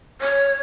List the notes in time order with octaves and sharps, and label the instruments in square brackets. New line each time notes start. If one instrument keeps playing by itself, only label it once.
[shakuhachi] C#5